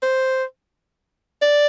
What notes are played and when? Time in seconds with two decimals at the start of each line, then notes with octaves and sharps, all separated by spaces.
0.03 C5
1.42 D5